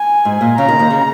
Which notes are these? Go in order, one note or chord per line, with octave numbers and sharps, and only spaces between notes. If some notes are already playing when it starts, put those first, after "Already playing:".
Already playing: G#5
G#2
A#2
C#3 A#5
D#2 D#3
D#2 D#3
C#3